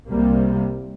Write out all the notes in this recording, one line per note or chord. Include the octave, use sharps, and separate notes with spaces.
C2 C3 G3 A#3